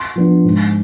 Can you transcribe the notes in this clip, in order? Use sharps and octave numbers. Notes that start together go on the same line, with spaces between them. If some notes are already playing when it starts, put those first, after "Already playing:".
Already playing: C6
F3 B3 D4
G#2